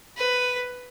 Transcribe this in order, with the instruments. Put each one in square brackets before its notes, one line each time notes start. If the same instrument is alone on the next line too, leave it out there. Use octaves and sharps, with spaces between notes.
[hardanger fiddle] B4